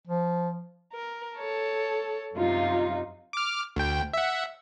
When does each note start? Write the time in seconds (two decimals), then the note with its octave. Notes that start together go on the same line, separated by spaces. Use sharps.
0.07 F3
0.93 A#4
1.36 A4 C#5 A5
2.35 F#2 C3 D#4 F4
3.33 D6 F6
3.76 D2 G5
4.13 E5 F#5